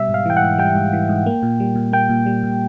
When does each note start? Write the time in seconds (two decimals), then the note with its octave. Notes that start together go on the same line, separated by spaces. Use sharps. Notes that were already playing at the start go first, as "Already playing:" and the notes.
Already playing: B2 G3 E5
0.09 G#2
0.14 F5
0.26 E3 G5
0.37 F#5
0.42 G#2
0.58 G3 G5
0.75 G#2
0.93 E3
1.09 G#2
1.26 A#3
1.43 A#2
1.60 G3
1.76 A#2
1.93 A#3 G5
2.09 A#2
2.26 G3
2.43 A#2